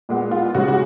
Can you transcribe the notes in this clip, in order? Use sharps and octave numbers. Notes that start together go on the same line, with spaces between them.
A#2 G#3 B3
F4
C#3 G#3 C#4 F#4
F#4